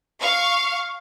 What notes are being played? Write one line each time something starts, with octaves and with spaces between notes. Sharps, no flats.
F5 C#6